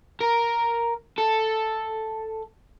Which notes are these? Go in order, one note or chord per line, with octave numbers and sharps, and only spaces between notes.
A#4
A4